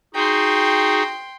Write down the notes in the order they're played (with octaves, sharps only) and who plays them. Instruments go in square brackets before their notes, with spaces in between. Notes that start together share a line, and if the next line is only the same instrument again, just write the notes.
[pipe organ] D#4 F#4 G#4 [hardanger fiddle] G5 C6